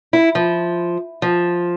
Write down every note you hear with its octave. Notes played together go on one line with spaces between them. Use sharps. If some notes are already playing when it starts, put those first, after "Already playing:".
E4
F3
F3